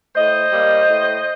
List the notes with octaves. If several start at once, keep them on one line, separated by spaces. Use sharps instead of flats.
A2 C5 D#5
G3 A#3
A2